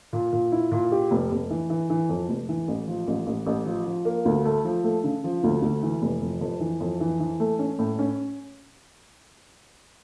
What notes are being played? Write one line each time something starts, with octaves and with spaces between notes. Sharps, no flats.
A#2
A#2
E4
A#2
G4
F1
F1
E3
E3
E3
F2
F1
E3
A1
F3
A1
A1
A1
F3
F3
A#3
D2
A3
F3
A3
C#3
F3
D2
D2
E3
F1
F2
F2
E3
F2
E3
E3
A3
C#4
A2
C#4